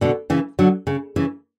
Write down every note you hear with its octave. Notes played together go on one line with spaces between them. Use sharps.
B2 D3
C#3 E3
D3 F#3
C#3
C#3 E3